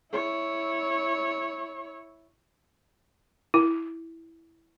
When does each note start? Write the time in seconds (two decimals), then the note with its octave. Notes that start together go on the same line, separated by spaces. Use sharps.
0.12 E4 C#5
3.54 E4